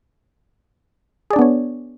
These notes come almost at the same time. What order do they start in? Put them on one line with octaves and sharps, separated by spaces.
G#4 D5 D4 B3 C#5